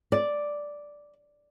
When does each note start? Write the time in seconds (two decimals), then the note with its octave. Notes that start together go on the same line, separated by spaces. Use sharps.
0.12 D5